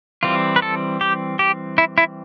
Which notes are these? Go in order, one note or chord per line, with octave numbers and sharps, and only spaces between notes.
E3 G3 C4 F4
B4
A4
G4
G4
E4
E4